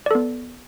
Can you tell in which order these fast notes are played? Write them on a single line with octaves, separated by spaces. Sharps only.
D5 A4 B3